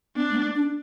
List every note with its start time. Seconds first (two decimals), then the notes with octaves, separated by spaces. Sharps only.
0.16 B3 D4
0.31 A3
0.36 B3
0.55 D4